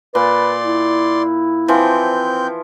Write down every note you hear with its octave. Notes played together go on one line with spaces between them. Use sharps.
A#2 B4 D5 C6
E4
E3 F3 C4 G6